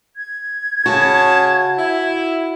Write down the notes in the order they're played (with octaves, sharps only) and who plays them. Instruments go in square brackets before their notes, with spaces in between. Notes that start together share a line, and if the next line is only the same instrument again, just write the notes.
[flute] G#6
[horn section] C#3 A5 [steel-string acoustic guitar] F#4
[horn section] E4